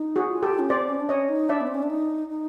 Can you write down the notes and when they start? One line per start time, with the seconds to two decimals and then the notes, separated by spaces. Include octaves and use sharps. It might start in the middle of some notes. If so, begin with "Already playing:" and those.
Already playing: D#4
0.16 F#4 G#4
0.29 F4
0.43 G4 A4
0.59 C#4
0.69 C4 C5 D5
0.89 C#4
1.00 D4
1.09 C#4 C#5 D#5
1.29 D#4
1.49 D4 D5 E5
1.61 B3
1.67 C4
1.74 C#4
1.83 D4
1.90 D#4
2.30 D#4